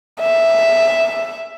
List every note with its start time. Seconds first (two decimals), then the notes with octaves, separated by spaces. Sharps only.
0.21 E5